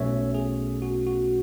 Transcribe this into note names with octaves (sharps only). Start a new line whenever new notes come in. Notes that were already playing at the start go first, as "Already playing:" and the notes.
Already playing: B1 B2 A3 C#4 C#5 E5
G#4
F#4
F#4